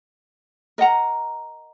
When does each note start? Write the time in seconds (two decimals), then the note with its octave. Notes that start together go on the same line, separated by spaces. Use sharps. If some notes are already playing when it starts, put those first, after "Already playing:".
0.78 A#4 D#5 F#5 A#5